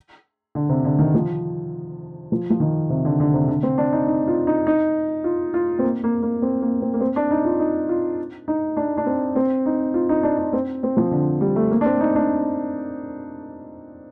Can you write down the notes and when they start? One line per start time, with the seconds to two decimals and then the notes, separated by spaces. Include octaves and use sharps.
0.55 D3
0.69 C3
0.84 D3
0.99 D#3
1.14 F3
2.32 F3
2.50 F3
2.60 D#3
2.90 C3
3.05 D3
3.20 D3
3.34 C3
3.48 D3
3.63 C4
3.78 D4
3.93 D#4
4.07 D#4
4.27 F4
4.47 D#4
4.67 D#4
5.24 F4
5.54 F4
5.79 C4
5.83 A#3
6.04 A#3
6.23 A#3
6.42 C4
6.62 A#3
6.82 C4
6.94 A#3
7.00 C4
7.16 D4
7.31 D#4
7.45 F4
7.60 D#4
7.89 F4
8.48 D#4
8.77 D4
8.97 D4
9.06 C4
9.36 C4
9.66 D#4
9.94 F4
10.09 D#4
10.23 D4
10.38 D4
10.53 C4
10.83 C4
10.97 F3
11.11 D3
11.41 G3
11.56 A3
11.71 A#3
11.81 D4
11.85 C4
12.01 D#4
12.15 D4